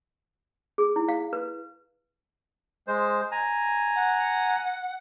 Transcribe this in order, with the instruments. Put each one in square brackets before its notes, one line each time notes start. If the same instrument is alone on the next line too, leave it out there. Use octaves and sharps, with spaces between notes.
[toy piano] G#4
E4
F5
B4
[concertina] G#3 C5
G#5 A#5
[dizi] F#5